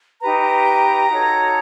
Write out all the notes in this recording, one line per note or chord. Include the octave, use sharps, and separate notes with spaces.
D#4 G4 B4 A#5
D#4 F#4 A4 C#5